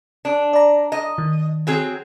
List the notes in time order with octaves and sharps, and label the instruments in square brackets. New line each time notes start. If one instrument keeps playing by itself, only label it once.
[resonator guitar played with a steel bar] D4
[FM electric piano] D5 A#5
[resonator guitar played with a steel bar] D#5
[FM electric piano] D#3
[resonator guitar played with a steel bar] F#3 C4 G#4